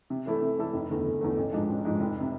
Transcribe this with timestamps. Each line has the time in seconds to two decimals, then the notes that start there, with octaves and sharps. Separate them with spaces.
0.10 C3
0.26 E3 A3 E4 A4
0.42 C3
0.58 E3 A3 E4 A4
0.74 F1
0.90 E2 D3 A3
1.05 F1
1.21 E2 D3 A3
1.37 A1
1.53 G#2 F3 G#3 D4
1.69 A1
1.85 G#2 F3 G#3 D4
2.00 F1
2.20 C3